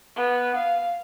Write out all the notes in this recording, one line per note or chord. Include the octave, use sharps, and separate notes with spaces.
B3
F5